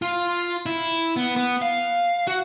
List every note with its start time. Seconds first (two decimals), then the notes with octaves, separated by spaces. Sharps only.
0.02 F4
0.66 E4
1.16 B3
1.36 B3
1.62 F5
2.27 F#4